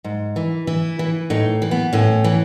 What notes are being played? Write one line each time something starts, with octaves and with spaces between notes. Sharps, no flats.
G#2
E3
E3 E4
E3
A2 D#4
E3
B3
A2 C#4
E3